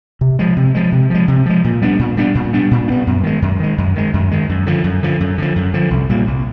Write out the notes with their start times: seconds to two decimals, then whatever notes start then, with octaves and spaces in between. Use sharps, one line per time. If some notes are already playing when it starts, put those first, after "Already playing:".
0.21 C3
0.39 F3 G#3
0.56 C3
0.75 F3 G#3
0.92 C3
1.10 F3 G#3
1.28 C3
1.46 F3 G#3
1.64 A#2
1.82 G3 B3 D4
1.99 A#2
2.17 G3 B3 D4
2.35 A#2
2.53 G3 B3 D4
2.71 A#2
2.88 G3 B3 D4
3.07 F#2
3.24 D#3 G#3
3.42 F#2
3.59 D#3 G#3
3.78 F#2
3.95 D#3 G#3
4.14 F#2
4.31 D#3 G#3
4.49 F#2
4.66 D3 F3
4.84 F#2
5.03 D3 F3
5.20 F#2
5.38 D3 F3
5.56 F#2
5.74 D3 F3
5.91 C2
6.09 A#2 G3 A#3
6.27 C2